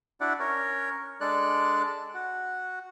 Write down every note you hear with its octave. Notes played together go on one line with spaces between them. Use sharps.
D4 E4 F#4 D5 F#5
C#4 A#4 C#5
G#3 D4 A4 D5 F#6
F#4